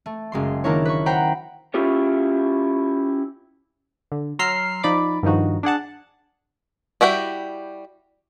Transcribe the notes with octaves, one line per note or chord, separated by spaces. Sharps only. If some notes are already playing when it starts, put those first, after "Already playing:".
A3
F#1 G#3 C6
D#3 A#3 D4 E4 A#4 C#5
B4 C#6
C5 F#5 G5 A#5 B5
C#4 E4 F4 G4 C#5
D3
F#3 A#5 C6 E6 F6 C7
F3 D#4 D5 B5 D6
G2 D#3 F3 D#4 F#4
D4 G#4 F#5 A5
G3 E4 F#4 G5